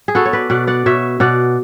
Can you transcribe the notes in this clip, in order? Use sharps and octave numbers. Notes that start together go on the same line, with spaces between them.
G#4
B3 F#4 A4
C#5
B4 D5
B2 D5 F#5
D5 F#5
B2 C#5 E5
B2 D5 F#5